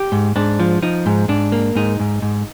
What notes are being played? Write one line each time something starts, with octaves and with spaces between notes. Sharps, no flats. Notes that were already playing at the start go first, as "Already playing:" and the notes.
Already playing: G4
G#2
G#2 D4
F3
F3 D#4
G#2
G#2 D4
A#3
G#2 D#4
G#2
G#2